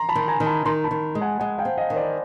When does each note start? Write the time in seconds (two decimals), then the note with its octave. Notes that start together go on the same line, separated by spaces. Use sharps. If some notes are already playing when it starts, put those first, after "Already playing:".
Already playing: A#5 C6
0.09 A5 B5
0.15 D#3
0.28 G#5 A#5
0.40 D#3
0.46 A5 B5
0.65 D#3 A#5 C6
0.84 A5 B5
0.91 D#3
1.15 G#3
1.21 F#5 G#5
1.40 G#3 F#5 G#5
1.58 F5 G5
1.65 C4
1.77 D#5 F5
1.90 D#3
1.96 C5 D5